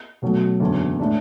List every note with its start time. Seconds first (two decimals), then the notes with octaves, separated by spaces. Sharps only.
0.22 B1 B2 F#3 A3
0.60 F#1 E2 D3 F#3
1.00 A2 G#3 D4